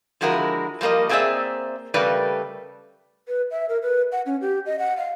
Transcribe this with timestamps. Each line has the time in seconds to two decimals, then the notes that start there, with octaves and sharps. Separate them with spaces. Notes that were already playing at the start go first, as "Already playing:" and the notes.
0.21 D3 F3 G#3 E4 F#4 A#4
0.81 F3 G3 A#3 A#4 D#5
1.09 A3 A#3 C4 G#4 D5 E5
1.94 C#3 G3 A3 A#4 B4 D5
3.28 B4
3.51 E5
3.69 A#4
3.82 B4
4.12 F#5
4.26 C#4
4.41 G4
4.66 D#5
4.79 F#5
4.97 F5